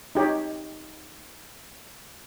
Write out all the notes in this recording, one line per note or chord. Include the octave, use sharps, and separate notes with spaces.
D#4 G4 C#5